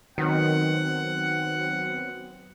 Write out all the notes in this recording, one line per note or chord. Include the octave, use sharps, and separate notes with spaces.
D#3 F#3 B3 C4 F#5